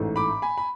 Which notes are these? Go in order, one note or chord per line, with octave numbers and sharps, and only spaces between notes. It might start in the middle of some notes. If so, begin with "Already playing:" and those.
Already playing: A1 G#2 E3 A3
B5 D6
G#5 B5
B5